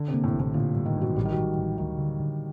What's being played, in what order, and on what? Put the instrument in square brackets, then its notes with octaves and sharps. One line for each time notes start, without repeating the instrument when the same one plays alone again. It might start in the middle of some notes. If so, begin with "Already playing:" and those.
Already playing: [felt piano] D3
C3
[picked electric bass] A#3
[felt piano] A2
[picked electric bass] A1
[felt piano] A2
[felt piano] A#2 [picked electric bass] D3
[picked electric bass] G2
[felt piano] D#3
[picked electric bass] G2
[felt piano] F#3
[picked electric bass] A1 [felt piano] G3
[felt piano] D#3
F#3
[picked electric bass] A1
A1
[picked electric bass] D2 [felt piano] D#3
[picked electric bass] D3
D3